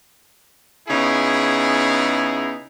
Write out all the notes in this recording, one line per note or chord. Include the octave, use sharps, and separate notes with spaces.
C#3 B3 D#4 E4 G#4